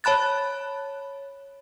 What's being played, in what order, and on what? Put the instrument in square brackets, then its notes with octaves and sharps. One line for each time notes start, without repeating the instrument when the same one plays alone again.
[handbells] C#5 A5 B5 F#6 A6